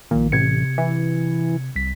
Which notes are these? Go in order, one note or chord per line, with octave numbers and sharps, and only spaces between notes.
A#1 A#2 D#3
A1 C3 G#6 C#7
E3
C2 B6